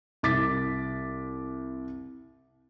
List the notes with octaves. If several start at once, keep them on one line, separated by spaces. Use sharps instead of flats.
C2 D6 A6 B6